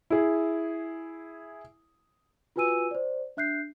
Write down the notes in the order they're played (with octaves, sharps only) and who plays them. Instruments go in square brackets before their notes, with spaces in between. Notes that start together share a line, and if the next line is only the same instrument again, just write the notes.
[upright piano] E4 G#4
[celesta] F4 F#4 B4 G#5 E6 D#7
C5 D5
D4 E5 F#6 G6 C7